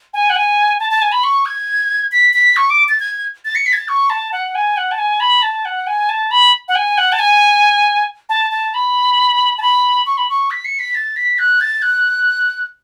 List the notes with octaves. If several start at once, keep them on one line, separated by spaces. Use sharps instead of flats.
G#5
F#5
G#5
A5
A5
G#5
B5
C#6
G#6
B6
B6
C#6
D6
A6
G#6
A6
C#7
B6
G#6
A6
C#6
A5
F#5
G#5
F#5
A5
G#5
B5
A5
F#5
G#5
A5
B5
F#5
G#5
F#5
A5
G#5
A5
A5
B5
A5
B5
C#6
B5
C#6
B6
C#7
B6
A6
B6
F#6
A6
F#6